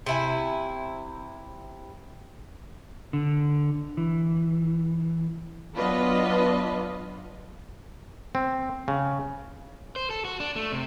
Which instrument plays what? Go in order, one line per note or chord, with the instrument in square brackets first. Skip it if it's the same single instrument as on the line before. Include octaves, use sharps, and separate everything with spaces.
[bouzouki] C3 E4 G#5
[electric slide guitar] D3
E3
[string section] F#3 B3 D4 F4 B4 D#5
[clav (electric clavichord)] C4
C#3
[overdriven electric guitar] C5
A4
F#4
D4
A3
C3